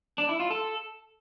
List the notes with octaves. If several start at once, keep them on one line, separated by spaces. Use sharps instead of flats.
D4
E4
F4
A4